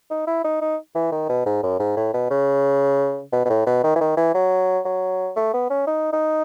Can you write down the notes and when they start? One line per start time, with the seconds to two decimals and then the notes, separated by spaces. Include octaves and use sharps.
0.11 D#4
0.27 E4
0.44 D#4
0.61 D#4
0.95 E3
1.12 D#3
1.29 B2
1.46 G#2
1.63 F#2
1.80 G#2
1.97 A2
2.14 B2
2.31 C#3
3.33 B2
3.45 B2
3.50 A2
3.67 B2
3.84 D#3
3.95 E3
4.01 D#3
4.17 E3
4.34 F#3
4.85 F#3
5.36 A3
5.53 B3
5.70 C#4
5.87 D#4
6.13 D#4